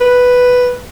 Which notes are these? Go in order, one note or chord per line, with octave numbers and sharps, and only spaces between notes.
B4